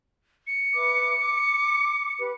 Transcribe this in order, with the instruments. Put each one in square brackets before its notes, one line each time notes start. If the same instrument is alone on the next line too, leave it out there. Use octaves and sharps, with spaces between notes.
[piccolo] C#7
[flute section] B4 E5 D6
D6
G4 B4